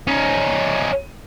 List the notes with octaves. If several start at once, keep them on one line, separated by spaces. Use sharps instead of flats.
C#4 D#4